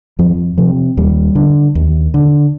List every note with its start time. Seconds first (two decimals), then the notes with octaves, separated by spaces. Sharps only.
0.19 F2 F3
0.58 C3 F3
0.97 D#2 G3
1.35 D3
1.75 D#2
2.14 D3